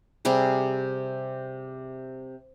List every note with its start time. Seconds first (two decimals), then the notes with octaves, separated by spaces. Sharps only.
0.25 C3 G3 G#4